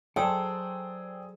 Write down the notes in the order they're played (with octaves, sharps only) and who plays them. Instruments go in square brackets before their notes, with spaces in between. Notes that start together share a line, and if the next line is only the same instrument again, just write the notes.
[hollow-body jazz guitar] F#3 A4 [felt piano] G#4 [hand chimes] C5 E6 [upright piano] D5 G5 C6